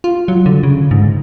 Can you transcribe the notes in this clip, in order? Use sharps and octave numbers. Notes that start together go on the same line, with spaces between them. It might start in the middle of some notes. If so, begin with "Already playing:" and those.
F4
F#3
D3
C#3
G#2